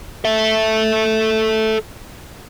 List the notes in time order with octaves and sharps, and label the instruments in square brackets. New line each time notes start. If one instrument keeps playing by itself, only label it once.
[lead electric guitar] A4 E5